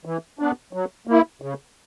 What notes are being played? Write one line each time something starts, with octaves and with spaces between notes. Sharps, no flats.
E3
B3 D4
F#3
A#3 E4
C#3